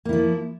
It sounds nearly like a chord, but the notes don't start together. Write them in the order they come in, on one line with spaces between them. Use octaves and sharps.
A#3 E4 F3